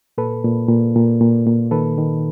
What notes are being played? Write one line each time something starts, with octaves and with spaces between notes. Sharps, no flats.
A#2 A4 B4
A#2
A#2
A#2
A#2
A#2
D#3 A4 B4
D#3